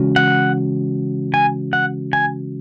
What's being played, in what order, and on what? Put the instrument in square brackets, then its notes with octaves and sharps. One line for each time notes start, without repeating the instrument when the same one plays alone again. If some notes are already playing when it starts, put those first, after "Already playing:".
Already playing: [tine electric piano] C#3 E3 G#3 C#4 F#4
[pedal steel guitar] F#5
G#5
F#5
G#5